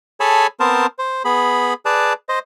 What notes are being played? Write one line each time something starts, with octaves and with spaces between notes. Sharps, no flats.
G#4 A4 C#5 G#5 A5 B5
B3 C4 A#4 C5 A5
C5
B3 G#4 B5
G#4 B4 D5 A5
C5 D#5